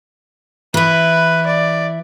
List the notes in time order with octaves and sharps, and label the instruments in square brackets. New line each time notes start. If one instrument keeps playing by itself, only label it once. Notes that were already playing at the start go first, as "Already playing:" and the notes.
[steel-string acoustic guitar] E3 E4 [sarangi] B4
[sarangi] D5